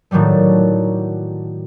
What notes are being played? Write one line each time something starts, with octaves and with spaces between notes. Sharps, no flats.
A2 D#3 F#3 G3 A3